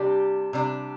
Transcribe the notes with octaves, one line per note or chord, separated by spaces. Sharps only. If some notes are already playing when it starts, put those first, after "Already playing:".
Already playing: C3 G3 D4 G4
C3 G3 D4